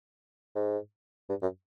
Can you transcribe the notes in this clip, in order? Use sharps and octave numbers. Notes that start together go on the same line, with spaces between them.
G#2
G2
F#2